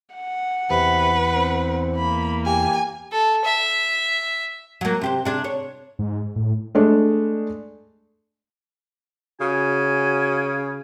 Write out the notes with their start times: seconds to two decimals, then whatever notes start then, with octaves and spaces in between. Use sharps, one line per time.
0.15 F#5
0.70 E2 C3 B4
1.35 C4
1.96 A#3 B5
2.45 G4 G#5
3.12 A4
3.44 E5
4.81 F#3 A#3
5.01 C3 G4 C5
5.25 C3 D4 G#4
5.44 C#5
5.99 G#2
6.36 A2
6.75 G#3 A3 D4
9.41 C#3 F#4 G#5